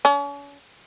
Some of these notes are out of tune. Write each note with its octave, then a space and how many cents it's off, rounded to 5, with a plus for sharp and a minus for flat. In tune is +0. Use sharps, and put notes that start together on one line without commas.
C#4 +40